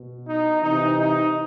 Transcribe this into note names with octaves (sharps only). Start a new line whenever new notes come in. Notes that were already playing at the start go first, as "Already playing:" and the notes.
Already playing: B2
D#4
C3 E3 D#4
D#4